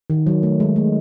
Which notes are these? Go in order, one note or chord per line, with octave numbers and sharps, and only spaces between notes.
D#3
F#3
A3
G#3
A3